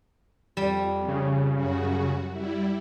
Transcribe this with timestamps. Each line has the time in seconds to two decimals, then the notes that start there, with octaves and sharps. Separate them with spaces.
0.57 F2 G3
1.08 C#3
1.55 F#2 F#4
2.31 G3 E4